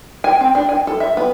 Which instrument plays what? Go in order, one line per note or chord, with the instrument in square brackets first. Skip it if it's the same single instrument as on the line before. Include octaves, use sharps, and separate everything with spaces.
[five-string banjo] G#5
C4
D4
G#5
A4
E5
B3